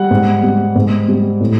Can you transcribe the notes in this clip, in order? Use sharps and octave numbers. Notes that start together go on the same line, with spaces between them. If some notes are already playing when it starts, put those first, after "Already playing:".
Already playing: G3 F#5
G#2
G3
G#2
G3
A2